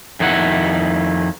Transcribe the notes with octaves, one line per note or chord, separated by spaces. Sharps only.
F2 D#3 E4 F#5